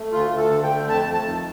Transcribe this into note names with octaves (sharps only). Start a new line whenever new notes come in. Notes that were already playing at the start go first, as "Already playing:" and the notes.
Already playing: A3
D2 F4
D2
A4
D3
G5
A3
F2 A5
F2
A5
D#3